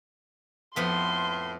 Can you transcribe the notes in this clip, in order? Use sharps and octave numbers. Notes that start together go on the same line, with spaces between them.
F2 A2 B3 B5 C6